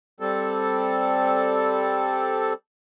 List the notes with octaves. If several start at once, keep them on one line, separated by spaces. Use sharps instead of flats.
G3 C4 A4